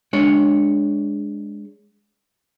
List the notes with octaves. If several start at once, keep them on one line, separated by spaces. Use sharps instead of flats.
G#3 D4 C#5